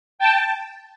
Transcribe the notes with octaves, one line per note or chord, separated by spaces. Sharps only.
G5 A5